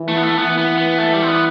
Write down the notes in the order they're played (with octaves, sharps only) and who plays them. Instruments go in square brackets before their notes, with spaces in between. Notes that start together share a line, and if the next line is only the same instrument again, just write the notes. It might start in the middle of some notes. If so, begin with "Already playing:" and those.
Already playing: [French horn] E3
[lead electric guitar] A3
B3
A3
[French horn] E3 [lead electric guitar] B3
[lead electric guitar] B3
B3
A3
G3
C4
B3